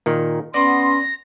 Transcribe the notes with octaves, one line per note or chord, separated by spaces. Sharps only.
A#2 D#3
B3 C#4 D5 C6 A#6